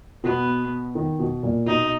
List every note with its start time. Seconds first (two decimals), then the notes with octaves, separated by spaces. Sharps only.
0.24 B2 B3
0.95 D#3
1.19 B2
1.43 A#2
1.66 B2 D#4